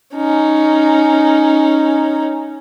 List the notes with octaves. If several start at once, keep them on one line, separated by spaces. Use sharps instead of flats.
C#4 D#4